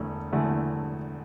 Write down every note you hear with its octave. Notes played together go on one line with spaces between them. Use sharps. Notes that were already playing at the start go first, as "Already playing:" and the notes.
Already playing: E1 E2 D3 A3
E1 E2 D3 A3